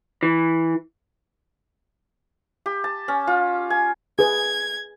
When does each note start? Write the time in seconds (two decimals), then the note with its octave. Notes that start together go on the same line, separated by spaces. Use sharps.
0.23 E3
2.66 G4
2.84 A5
3.08 C#4
3.27 F4
3.70 G#5
4.19 G#4 B4 G#6